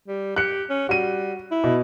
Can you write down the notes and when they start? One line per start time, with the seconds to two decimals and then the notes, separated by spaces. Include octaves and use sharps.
0.08 G3
0.36 G4 F#6 C#7
0.70 C#4
0.89 G3 F#4 D#7
1.51 E4
1.64 B2